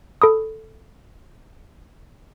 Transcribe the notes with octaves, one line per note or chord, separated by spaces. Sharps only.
A4 B5 D#6